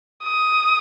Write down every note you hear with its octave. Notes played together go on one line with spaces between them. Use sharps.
D#6